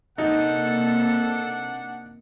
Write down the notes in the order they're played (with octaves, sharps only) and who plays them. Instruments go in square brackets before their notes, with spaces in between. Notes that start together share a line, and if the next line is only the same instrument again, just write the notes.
[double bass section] C3 A#3 [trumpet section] D4 F#5 [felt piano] D#4 [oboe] A4